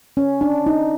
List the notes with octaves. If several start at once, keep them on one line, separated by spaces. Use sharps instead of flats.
C#4
D4
D#4